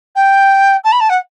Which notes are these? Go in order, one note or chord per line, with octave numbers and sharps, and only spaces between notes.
G5
A5
B5
A5
F#5